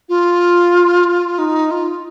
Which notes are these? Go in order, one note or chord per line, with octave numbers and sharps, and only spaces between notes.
F4
D#4
F4